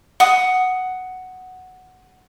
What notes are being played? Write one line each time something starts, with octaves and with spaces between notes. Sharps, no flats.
F#5 D#6